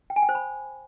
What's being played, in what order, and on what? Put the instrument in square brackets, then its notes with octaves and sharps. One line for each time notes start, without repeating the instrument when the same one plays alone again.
[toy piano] G5
G#5
G5
C5
B5